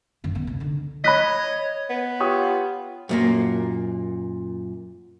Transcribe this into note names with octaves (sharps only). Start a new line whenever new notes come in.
F#2 D#3
D#3 B3
C#2 C3
D3 D#4
C#5 D#5 B5 F#6 B6
B3
F4 G4 C#5 D#6
F#2 A#2 A#3